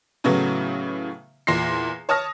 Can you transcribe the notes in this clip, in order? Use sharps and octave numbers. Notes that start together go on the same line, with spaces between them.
A2 C#3 E3 F#3 A3 B3
E2 A#2 C6 A#6 C7
C#5 A5 D#6 F6 A#6